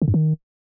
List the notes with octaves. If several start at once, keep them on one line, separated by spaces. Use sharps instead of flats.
D3
G2
D#3